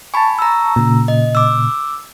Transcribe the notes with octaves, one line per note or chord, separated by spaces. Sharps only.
G#5 A5 B5 C#6
A#5 E6
A#2 C#3
D#5
D6 E6